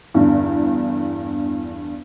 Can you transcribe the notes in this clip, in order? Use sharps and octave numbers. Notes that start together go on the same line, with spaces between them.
E2 G2 D3